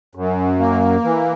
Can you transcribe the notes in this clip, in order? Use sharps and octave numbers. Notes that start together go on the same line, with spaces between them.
F#2
A#3
E3